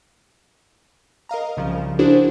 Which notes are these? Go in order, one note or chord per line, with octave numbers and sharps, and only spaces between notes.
A#4 D#5 F5 A#5
C2 C#3 F3
D4 E4 F#4 G#4 A#4 C5